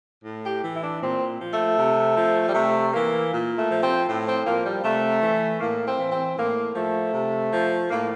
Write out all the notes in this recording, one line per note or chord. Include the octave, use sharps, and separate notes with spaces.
A2
G4
E3
E4
D4
A#2 C4
F3
A3
C3
F3
G3
C3 A3
E3 A#3
A#2
A3
F3
C4
A2
C4
F3 A#3
G3
C3 A3
E3
A2 A#3
C4
E3
C4
A2 A#3
F3 A3
C3
F3
A2 A#3